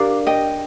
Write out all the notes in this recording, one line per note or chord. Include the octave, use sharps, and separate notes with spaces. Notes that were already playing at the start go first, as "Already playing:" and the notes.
Already playing: D4 G4 A#4 D5 F5
D#5 G5